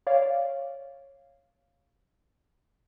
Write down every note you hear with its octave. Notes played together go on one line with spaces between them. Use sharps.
C#5 D5 F5